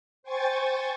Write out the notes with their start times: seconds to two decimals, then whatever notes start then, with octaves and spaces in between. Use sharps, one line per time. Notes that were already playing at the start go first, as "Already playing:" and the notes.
0.23 C5 G5 G#5 C#6 G#6 A6